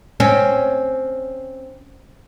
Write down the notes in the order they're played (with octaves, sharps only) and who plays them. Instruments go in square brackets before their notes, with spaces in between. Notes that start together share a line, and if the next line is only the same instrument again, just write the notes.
[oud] C4 C#4